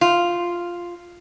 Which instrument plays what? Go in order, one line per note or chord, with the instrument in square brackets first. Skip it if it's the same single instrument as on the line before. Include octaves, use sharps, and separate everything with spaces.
[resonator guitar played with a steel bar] F4